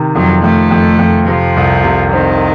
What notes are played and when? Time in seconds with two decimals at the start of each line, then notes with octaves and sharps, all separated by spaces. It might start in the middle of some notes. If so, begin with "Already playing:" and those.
Already playing: C3 D#3
0.15 F2 F#3
0.43 F2 A3
0.71 F2
0.99 F2
1.27 C3 F3
1.56 C2
1.84 C3
2.12 D#3 C4